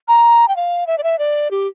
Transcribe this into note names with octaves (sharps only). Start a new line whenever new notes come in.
A#5
G5
F5
E5
D5
E5
D5
G4